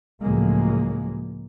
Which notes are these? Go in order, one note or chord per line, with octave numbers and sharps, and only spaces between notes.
C#2 A2 F3 F#3 G#3 A#3